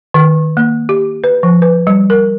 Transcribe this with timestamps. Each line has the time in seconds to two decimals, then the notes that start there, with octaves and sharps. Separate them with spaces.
0.14 D#3
0.57 A#3
0.89 G4
1.24 B4
1.43 F3
1.62 B4
1.87 G3
2.10 A#4